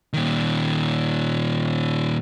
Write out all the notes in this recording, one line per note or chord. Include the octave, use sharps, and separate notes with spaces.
A#2 D#3